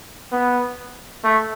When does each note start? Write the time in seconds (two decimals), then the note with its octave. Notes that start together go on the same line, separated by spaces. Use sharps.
0.32 B3
1.24 A3